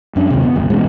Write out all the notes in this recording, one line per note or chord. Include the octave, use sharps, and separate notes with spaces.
F#2 C#4 D4
D#2 C3
B3
G1 C#2
E1 A1 B2 G#3